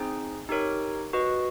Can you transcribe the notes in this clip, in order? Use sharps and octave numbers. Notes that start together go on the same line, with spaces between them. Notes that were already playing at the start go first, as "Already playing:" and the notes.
Already playing: C4 D#4 G#4 C5
D#4 G4 A#4 C#5
F#4 B4 D#5